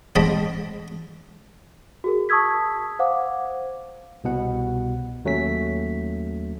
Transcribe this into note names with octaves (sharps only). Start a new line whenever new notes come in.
A1 G#2 C4 D#5 A5 B5
F#4 G#4 A#4
A5 C#6 D#6 E6 G#6 B6
C5 F5 F#5 D6
C2 B2 F#5
D#2 F#3 A3 C#4 B6